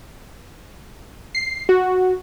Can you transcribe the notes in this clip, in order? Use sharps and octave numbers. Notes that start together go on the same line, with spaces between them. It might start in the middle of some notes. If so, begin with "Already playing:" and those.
C7
F#4